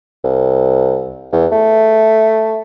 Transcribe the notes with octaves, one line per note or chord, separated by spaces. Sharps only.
C2
E2
A3